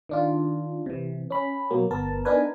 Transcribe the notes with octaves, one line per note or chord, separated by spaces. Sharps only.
D#3 D4 F4
C3 E3
C#4 B5
B2 F#3 A#3
G1 B3 A#4 A5
B3 D4 D#4 A#4 B4 G#5